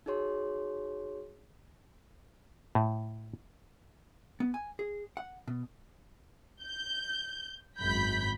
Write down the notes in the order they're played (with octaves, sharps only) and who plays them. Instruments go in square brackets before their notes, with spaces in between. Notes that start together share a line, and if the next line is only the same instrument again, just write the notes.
[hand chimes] D#4 F#4 G#4 C#5 C6
[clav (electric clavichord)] A2
[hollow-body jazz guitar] B3
G#5
G#4
F#5
B2
[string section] G6
G#1 F#2 B5 G6 B6